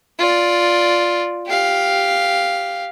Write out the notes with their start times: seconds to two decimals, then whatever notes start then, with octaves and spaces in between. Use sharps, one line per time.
0.18 F4 D5
1.46 G4 F5